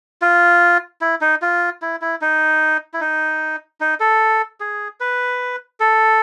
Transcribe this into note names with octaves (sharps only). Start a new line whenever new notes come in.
F4
E4
D#4
F4
E4
E4
D#4
E4
D#4
D#4
A4
G#4
B4
A4